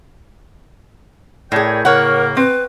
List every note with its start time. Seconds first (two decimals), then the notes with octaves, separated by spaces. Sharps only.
1.52 A2 G#4 A#4 C#5 D5 G5
1.85 A2 C#3 A#3 A#4 C#5 F#5
2.37 C4 B4